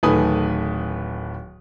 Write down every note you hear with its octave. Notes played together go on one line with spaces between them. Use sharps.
D1 D#3 A3 B4 G#5 D#6